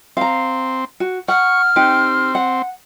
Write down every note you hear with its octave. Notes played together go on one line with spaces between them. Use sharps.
C4 F5 A#5
F#4
F#5 C#6 F6
C4 D#4 G4
F#5